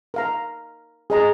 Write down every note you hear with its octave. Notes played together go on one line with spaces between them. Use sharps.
A#4 F5 A#5
G#4 D#5 A#5